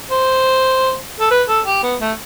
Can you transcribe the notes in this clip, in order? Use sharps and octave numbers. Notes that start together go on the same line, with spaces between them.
C5
A4
B4
A4
G4
B3
A3